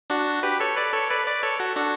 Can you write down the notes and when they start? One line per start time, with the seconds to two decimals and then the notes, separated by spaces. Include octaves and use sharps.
0.10 D4 F#4
0.43 G4 B4
0.60 A4 C#5
0.76 B4 D5
0.93 A4 C#5
1.10 B4 D5
1.26 B4 D5
1.43 A4 C#5
1.60 F#4 A4
1.76 D4 F#4